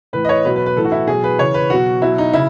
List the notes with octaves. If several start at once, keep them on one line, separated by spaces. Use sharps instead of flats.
A2 E3 B4
D#5
C#5
B2 F#3 B4
B4
B4
A2 E3 A4
F#4
E4
B2 F#3 G#4
B4
C#3 E3 C#5
B4
B2 F#3 F#4
B2 F#3 E4
D#4
C#3 E4